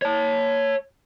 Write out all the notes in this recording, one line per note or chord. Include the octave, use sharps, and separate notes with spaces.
C#5 A5